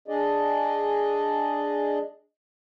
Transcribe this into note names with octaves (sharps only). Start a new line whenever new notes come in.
D4 G#4 D5 D#5